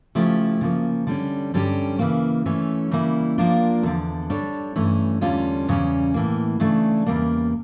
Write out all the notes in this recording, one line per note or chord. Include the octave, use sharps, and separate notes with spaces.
C#3 F3 A3 E4 G4
C#3 F3 A#3
D3 G3 C#4
G2 D3 G3 C#4 G4
C#3 E3 A#3
E3 A3 C#4
C#3 E3 G3 A#3 E4
F3 A#3 D4 F4 A#4
E2 D3 F3
G3 D4 A4 C#5
G2 E3 A3 C#4
E2 D3 G3 C#4 F4
E2 C#3 G3 C#4
A2 E3 A#3
C#3 E3 A3 D4
E2 C#3 G3 A#3